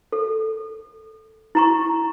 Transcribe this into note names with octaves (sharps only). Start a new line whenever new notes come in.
A4
E4 A#5 C#6